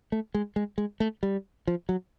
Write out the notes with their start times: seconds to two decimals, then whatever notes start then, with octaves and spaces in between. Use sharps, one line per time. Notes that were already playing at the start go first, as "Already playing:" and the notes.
0.12 A3
0.34 G#3
0.56 G#3
0.78 G#3
1.00 A3
1.23 G3
1.68 F3
1.89 F#3